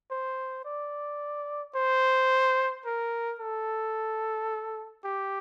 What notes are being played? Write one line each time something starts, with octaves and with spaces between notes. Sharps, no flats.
C5
D5
C5
A#4
A4
G4